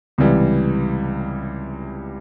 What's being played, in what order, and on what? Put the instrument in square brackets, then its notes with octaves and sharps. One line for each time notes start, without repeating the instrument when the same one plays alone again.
[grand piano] C#2 C3 E3 G3